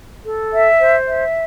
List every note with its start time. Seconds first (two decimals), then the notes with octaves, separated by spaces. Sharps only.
0.25 A4
0.53 E5
0.80 C5
1.07 E5